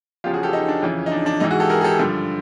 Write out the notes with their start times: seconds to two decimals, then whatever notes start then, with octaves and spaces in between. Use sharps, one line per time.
0.24 E2 C#3 F3 F4 G4
0.33 F#4 G#4
0.43 G4 A4
0.53 D#4
0.68 D4
0.82 F2 C#3 E3
1.06 D#4
1.11 D4
1.26 D4
1.40 G#2 E3 D#4
1.51 F#4 G#4
1.60 G4 A4
1.70 G#4 A#4
1.81 G#4
1.84 G4 A4
1.99 G2 D3 F3